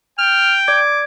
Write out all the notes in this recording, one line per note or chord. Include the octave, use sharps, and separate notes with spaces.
G5 F6
D5 D6 G#6